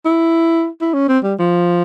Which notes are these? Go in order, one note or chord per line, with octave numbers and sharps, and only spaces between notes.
E4
E4
C#4
C4
G3
F3